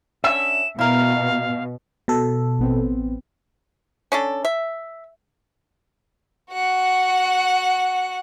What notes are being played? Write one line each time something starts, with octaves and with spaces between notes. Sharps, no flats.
D3 C#4 E5 E7
B2 E4 A#4 F5
B2 A4
A1 B3 C4
C#4 D4 A4
E5
F#4 F#5